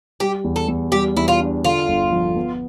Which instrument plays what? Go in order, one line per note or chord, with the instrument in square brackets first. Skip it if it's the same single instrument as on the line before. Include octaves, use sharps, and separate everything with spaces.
[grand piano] G3 [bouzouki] G4
[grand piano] E2
[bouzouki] A4
[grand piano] E2
[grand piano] G3 [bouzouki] G4
[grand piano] E2 [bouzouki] E4
[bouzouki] F4
[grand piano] D4
[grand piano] D3 [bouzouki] F4
[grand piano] G1
F3
B3